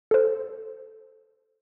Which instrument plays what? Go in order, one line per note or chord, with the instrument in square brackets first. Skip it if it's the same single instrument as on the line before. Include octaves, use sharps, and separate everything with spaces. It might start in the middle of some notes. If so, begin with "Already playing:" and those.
[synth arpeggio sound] A4 C5